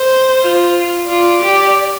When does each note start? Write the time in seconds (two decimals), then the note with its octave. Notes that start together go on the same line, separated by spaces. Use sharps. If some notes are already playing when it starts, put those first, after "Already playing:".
Already playing: C5
0.43 F4
1.09 F4 D5
1.42 G4